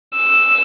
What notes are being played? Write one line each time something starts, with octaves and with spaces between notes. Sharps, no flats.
E6